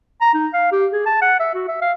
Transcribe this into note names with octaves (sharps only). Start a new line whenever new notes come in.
A#5
D#4
F5
G4
G#4
A5
F#5
E5
F#4
E5
F5